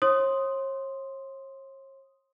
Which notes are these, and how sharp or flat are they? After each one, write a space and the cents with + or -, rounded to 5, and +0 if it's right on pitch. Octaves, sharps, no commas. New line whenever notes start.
C#5 -45 C6 +0 D#6 +0